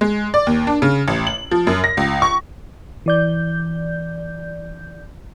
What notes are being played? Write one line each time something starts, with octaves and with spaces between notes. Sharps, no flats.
G#3
D5
D#2
D4
C#3
A1
F#7
F3
F#2
A#6
C#2
C#6
E3 D5 G6